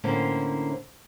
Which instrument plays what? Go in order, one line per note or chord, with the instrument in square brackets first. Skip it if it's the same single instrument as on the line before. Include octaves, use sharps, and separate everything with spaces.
[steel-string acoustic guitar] A2 D3 A#3 C#4 E4 C5